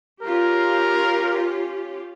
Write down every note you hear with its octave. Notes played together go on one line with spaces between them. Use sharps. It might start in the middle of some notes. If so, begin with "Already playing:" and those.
C#4 F4 G4 A#4